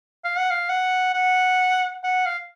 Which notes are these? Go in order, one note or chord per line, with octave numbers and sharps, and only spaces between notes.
F5
F#5
F5
F#5
F#5
F#5
F5